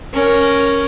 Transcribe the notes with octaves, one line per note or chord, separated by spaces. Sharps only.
C#4 A#4